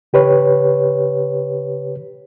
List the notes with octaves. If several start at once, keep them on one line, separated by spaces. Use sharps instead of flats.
C#3 G4 B4 C#5